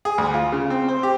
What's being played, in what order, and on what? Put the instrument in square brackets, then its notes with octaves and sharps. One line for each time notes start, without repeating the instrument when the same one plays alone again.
[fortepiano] G#4
D2
F4
C#3
C4
C5
G4